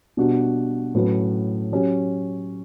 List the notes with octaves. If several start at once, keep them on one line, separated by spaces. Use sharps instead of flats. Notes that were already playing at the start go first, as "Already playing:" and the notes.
B2 G3 D4 F#4
A2 F#3 C#4 F#4 B4
F#3 C#4 G4